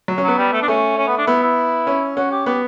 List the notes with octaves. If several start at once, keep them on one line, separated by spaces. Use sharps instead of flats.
F#3
C#4
F#3 B3
G3
A3
D4
A3 C#4
C#4
B3
D4
B3 E4
E4
C#4
C#4 F#4
G4
B3 G4